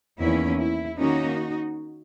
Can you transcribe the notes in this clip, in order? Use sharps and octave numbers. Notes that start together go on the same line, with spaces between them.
E2 D#3 A#3 C#4 E4
E4
D#3 A#3 C#4 D#4 F#4